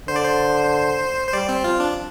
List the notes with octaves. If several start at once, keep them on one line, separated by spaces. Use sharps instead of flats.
D3 C5
D5
C5
C5
G3 D5
C4
F3 F4
D4